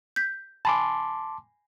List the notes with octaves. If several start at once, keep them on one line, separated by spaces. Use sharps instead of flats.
G6 B6
G#5 A5 B5 C6 D6